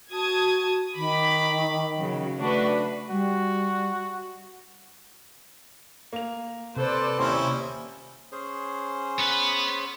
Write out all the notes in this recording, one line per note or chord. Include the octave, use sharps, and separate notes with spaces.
F#4 A5 D#6 G#6
D#3 B5 D6
C#3 F#3
A3 D4 F#4 B4
G3 F#4
A#3 F7
C3 A4 B4 C5 D5
D#1 C#4 E4 G4 C6
C#4 G#4 C5
B3 B4